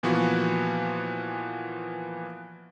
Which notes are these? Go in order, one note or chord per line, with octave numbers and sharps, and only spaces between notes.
A#2 E3 F3 B3 F#4